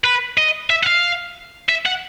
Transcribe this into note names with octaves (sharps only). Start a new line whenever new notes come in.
B4
D#5
E5
F#5
F5
E5
F#5